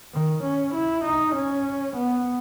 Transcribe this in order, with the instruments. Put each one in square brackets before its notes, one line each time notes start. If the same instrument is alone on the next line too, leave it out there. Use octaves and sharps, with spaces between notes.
[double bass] D#3
C#4
E4
D#4
C#4
B3